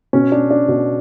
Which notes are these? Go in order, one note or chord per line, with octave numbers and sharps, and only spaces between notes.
B2 C#4
D4
D4
B2